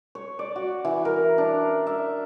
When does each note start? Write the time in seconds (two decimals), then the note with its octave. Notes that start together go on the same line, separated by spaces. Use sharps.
0.15 C#5
0.39 D5
0.56 F#4
0.85 E3
1.05 A#4
1.38 D4
1.87 E5